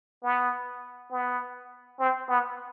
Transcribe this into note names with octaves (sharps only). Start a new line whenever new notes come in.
B3
B3
C4
B3